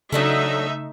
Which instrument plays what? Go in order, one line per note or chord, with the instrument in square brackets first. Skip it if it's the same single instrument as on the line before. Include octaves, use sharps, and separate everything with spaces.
[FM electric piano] C#3 [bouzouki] F#3 D4 A4 [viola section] A3 D#4 E5